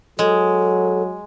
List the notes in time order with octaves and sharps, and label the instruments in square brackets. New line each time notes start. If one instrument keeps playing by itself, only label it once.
[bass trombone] F#3 [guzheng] G#3 [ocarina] A4